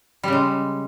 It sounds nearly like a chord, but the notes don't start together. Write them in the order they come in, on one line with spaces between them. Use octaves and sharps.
G3 C#3 G#3